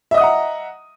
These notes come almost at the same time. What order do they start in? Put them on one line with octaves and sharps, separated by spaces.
E5 D#5 D#6 F#5 A#5